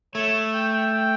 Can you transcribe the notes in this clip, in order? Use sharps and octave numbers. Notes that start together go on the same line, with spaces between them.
A3 C#5
G5
G5
G5